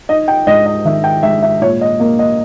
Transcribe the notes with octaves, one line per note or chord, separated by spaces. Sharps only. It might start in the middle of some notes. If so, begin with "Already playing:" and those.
D#4 D#5
G5
G#2 D#5
D#5
D#3 E5
G5
G#2 E5
E5
A#2 C#5
D#5
A#3
D#5